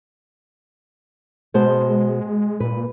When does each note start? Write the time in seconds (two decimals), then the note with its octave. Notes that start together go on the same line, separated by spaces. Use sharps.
1.54 B2 G#3 C5 A5
2.60 A#2 B4